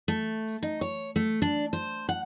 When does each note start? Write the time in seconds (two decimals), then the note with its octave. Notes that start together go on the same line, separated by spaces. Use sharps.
0.08 A3
0.63 D#4
0.81 C#5
1.16 A3
1.42 D4
1.73 C5
2.09 F#5